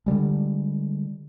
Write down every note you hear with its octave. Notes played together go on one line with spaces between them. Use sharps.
D3 D#3 G3 G#3